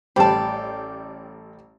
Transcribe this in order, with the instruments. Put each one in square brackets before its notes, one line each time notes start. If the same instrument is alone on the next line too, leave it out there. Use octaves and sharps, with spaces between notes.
[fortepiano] A1 G3 C5 [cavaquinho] G4 D5 [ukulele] A5 B5